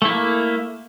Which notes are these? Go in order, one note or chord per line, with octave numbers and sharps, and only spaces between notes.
A3 A#3 E4